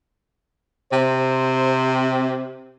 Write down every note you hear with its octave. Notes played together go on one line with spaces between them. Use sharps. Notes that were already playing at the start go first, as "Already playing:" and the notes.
C3 C5